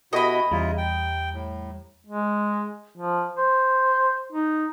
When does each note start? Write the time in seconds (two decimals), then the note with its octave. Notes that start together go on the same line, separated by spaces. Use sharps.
0.13 B2 E4 F#4 G4 A4 D#5 B5 A#6
0.51 E2 C#3 G3 E4 F4 A#5
0.78 G5
1.34 A2
2.07 G#3
2.97 F3
3.37 C5
4.32 D#4